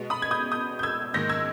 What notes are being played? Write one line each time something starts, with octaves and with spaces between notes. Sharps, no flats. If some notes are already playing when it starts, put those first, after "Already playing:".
Already playing: B2 G#3 B3
B5 D#6
G#6
D#6 G6
D#6 G6
G6
E6 G#6
G#2 D#3 A#3 G6 A#6
E6 G#6